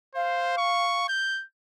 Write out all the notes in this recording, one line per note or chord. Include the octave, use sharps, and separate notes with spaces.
C5 F5
C#6
G6